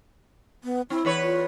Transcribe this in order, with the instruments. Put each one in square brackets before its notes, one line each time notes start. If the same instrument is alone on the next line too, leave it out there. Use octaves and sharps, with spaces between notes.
[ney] B3
[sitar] C4 [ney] E4
[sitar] E2 B4 C#5
[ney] F4